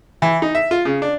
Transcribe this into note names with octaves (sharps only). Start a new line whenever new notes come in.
E3
D#4
E5
F4
C#3
D4